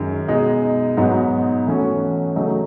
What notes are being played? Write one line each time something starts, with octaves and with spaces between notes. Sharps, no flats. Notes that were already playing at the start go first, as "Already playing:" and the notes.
Already playing: F#2 D#3 G#3
B2 G#3 D#4
G#2 F#3 B3 D#4
E3 A3 C#4 F#4
C#3 F#3 A3 D#4